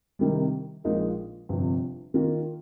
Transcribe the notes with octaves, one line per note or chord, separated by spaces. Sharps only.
C3 D#3 G3
A#1 A#2 G#3 D#4 A#4
G1 F2 C3
D#3 A#3 F4 A#4